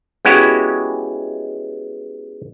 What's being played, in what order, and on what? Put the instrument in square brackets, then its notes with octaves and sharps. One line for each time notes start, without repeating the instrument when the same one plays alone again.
[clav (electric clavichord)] G#3 B3 C#4 E4 F#4 G4